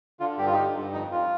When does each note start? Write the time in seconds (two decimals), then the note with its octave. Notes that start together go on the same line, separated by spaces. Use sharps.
0.20 D3 F4
0.38 G2 G4
0.46 F4
0.53 D3 D#4 G4
0.75 G2
0.93 F2 D#4
1.11 F2 F4